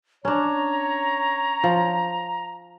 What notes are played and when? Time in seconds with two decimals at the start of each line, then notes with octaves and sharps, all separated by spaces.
0.25 C#4 D4 C#5 A#5
1.64 F3